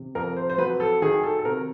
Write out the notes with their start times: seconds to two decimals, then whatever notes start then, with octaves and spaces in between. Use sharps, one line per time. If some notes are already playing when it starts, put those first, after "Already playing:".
Already playing: C3 D#3
0.15 F2 A#4
0.36 C5
0.50 C5
0.58 F#3 B4
0.80 A4
1.02 D#3 G#4
1.24 A4
1.39 A4
1.45 C3 A#4